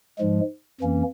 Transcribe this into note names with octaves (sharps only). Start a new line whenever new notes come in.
G#2 F3 G#3
F2 E3 A#3 C#4